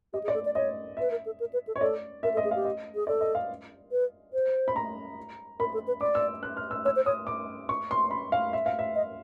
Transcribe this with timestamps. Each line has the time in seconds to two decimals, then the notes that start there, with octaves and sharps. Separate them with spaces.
0.13 G4 D#5
0.24 G#4
0.28 D5
0.34 A4
0.45 D5
0.55 C#5 D#5
0.97 B4 E5
1.11 A#4
1.26 A4
1.40 A#4
1.53 B4
1.67 A4
1.76 C#5
1.81 A4 D5
2.23 A#4 E5
2.34 A4
2.37 D#5
2.44 G#4
2.51 G4 F5
2.65 D#5
2.95 G#4
3.07 A4 D5
3.21 D#5
3.35 F5
3.92 B4
4.33 C5
4.68 B5
4.76 A#5
5.60 A#4 B5
5.74 A4
5.88 B4
6.01 D5 D6
6.15 E6
6.43 F#6
6.57 F6
6.71 E6
6.85 C#5 E6
6.96 C5
7.06 C#5 D#6
7.27 D6
7.69 C#6
7.91 C6
8.11 B5
8.32 F5
8.53 E5
8.66 F5
8.79 E5
8.95 D#5